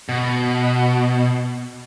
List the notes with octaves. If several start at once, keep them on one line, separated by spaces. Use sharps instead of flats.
B2